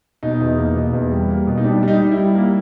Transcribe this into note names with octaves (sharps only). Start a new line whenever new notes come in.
B2 D#4
E2
A#3
B2
E2
G3
A#3
B2
D#4
G3 D4
G3
D#4
G3
E4
G3
A#3